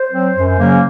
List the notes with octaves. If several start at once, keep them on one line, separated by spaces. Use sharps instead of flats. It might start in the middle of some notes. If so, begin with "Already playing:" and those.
Already playing: C5
F#3 C4
F#2
C#3 F#3 A#3 C#4